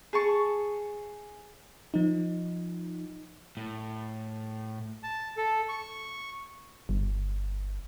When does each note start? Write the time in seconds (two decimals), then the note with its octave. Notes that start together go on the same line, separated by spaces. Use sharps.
0.13 G#4 A5 C#6
1.94 F3 D#4
3.57 A2
5.03 A5
5.37 A4
5.69 C#6
6.89 G1